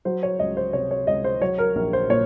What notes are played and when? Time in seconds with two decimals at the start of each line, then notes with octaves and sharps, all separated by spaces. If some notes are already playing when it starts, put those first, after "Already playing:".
0.05 F#3 C5
0.23 C#5
0.39 C#2 D#5
0.57 C5
0.73 C3 C#5
0.91 C#5
1.07 C#2 D#5
1.24 C5
1.41 F#3 C#5
1.58 A#4
1.76 A#1 A#4
1.93 C5
2.10 A#2 C#5